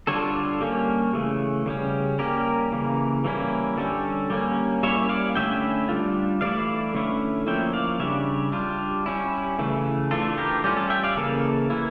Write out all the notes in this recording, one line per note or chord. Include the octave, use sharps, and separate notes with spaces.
D3 G3 D4 F4 A4 C#5
G3 A#3 C#4
C#3 E3 A3
C#3 G3 C#4
G3 A#3 C#4 G4 A#4
C#3 E3 A#3
E3 G3 A#3 C#4 E4
D3 G3 C#4 A4
G3 A#3 C#4
G3 A#3 C#4 E4 C#5 E5
D5 F5
D3 A3 C#4 E4 E5 G5
G3 D4 F4
E3 A3 E4 D5 F5
D3 A3 C#4 E4
F3 A#3 C#4 E4 E5 G5
D5 F5
C#3 G3 D4 C#5 E5
G3 D4 F4
G3 C#4 E4
C#3 E3 A3
E3 A3 D4 F4 A4
G4 A#4
G3 C#4 F4 G4
A4
E5 G5
D5 F5
C#3 E3 A#3 A4
E3 A#3 E4